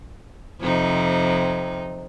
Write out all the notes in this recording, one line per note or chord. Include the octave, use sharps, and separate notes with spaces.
F2 C3 D#4